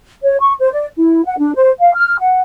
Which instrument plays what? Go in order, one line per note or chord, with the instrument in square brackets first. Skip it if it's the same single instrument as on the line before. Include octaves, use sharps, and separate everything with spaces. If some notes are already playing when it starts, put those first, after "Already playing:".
[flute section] C#5
C#6
C5
D5
E4
F#5
D4
C5
F5
F6
F#5